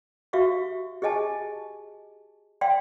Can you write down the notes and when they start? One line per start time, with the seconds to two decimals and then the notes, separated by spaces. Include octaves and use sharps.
0.33 F#4 G4 E5 F5 C#6
1.02 G4 G#4 D#5 G#5 A5
2.61 D5 F5 G5 C6